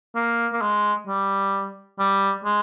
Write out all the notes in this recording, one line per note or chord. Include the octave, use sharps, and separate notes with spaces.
A#3
A#3
G#3
G3
G3
G#3